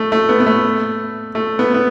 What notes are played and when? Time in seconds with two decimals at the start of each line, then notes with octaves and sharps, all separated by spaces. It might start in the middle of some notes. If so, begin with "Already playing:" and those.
Already playing: A3
0.12 A3
0.29 B3
0.40 B3
0.46 A3
1.35 A3
1.59 B3
1.74 B3